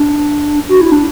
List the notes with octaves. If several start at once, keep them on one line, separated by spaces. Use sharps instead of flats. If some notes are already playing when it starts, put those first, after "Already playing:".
Already playing: D4
F#4
E4
D4